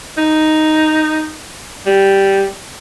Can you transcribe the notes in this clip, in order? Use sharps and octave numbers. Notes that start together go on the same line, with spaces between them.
D#4
G3